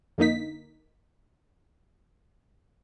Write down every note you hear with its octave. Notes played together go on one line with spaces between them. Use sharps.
F2 D3 A#3 D#4 B6